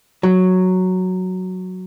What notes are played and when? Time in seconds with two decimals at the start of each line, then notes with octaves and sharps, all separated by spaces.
0.23 F#3